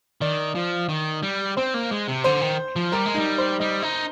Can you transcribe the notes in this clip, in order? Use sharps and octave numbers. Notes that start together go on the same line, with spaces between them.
D#3 D5
F3
D#3
G3
C4 C5
A#3
G#3
C3
D3 C5
D#3
F3
G3 A#4
G#3
G3 D#4
C5
G3 D#5
D#4